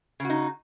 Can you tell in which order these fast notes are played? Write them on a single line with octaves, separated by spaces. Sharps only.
C#3 F#4 D#4